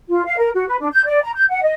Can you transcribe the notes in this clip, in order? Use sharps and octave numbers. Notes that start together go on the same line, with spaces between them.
F4
F5
A#4
F#4
B4
D4
G6
D5
A#5
G6
F#5
D#5